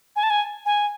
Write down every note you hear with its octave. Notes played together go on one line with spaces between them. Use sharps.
G#5
A5
G#5
G#5